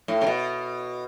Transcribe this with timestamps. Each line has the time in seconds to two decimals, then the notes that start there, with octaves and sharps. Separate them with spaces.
0.08 A2
0.21 C#3
0.27 B2